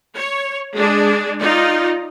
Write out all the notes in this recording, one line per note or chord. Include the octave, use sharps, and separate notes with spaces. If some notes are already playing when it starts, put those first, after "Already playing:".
C#5
G#3 D4 G#4
D#4 F4 D5